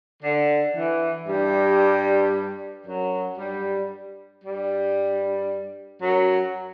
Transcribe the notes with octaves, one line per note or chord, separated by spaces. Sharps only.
D3
E3
G2 G3
F#2 F#3
G2 G3
G2 G3
F#2 F#3